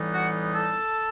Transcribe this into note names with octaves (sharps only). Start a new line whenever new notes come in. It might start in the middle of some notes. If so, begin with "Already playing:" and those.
Already playing: A2 E3 G3 B3 D#4
F#4 F#5
A4 A5